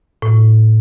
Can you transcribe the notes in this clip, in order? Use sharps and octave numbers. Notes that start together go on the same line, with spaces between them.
A2